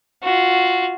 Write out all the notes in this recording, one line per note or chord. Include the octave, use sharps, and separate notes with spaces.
F4 F#4